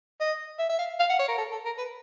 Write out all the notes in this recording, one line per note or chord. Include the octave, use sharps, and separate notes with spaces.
D#5
E5
E5
F5
F5
F#5
C#5
A#4
A4
A4
A#4
B4